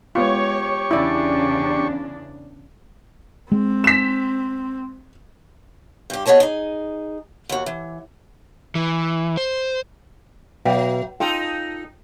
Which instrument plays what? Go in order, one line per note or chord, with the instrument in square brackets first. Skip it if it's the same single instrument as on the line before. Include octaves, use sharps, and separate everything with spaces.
[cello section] G#3 C#5 [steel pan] B3 F4 [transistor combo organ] G4 C#6
[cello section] E2 C#3 D4 [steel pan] E4 D5
[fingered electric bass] G#3 [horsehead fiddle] C4
[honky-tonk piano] B6 E7
[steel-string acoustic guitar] G2 G4
B3 G#4 C#5 D#5 A5
D#4 G#4
D#2 F#4
E3
[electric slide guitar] E3
C5
[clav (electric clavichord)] B2 [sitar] F#3 [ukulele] E5 F5 G5
[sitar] D#4 A4 [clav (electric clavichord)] F4 [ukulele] G5